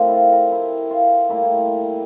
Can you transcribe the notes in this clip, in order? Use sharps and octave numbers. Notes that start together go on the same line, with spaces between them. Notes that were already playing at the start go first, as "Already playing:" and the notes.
Already playing: A2 F3 C4 G4 A#4
E4 F4
A#4
E4
F4
A2 G3 A#3 E4